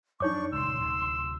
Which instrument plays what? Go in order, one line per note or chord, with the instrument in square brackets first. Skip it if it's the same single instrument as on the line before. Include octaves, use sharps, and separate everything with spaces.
[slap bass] F#2 F3 [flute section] D4 C#6 [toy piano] D#4 C#5 D6
[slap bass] D#1 C#2 [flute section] C6 [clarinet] E6
[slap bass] D1 C3